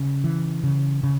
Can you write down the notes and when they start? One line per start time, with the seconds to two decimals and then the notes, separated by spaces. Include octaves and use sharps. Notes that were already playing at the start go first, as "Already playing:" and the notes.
Already playing: C#3
0.24 E3
0.63 C#3
1.03 C#3